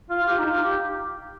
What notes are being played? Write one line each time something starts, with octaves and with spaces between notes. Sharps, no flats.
F4
F4
G4
D#4
F4
G4